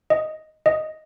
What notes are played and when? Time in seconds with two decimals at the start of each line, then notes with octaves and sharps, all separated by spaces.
0.10 D#5
0.66 D#5